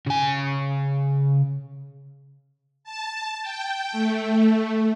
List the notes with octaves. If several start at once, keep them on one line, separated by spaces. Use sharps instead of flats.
C#3 G#5
A5
G5
A3